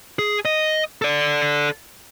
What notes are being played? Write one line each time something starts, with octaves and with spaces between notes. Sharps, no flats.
G#4
D#5
A4 D5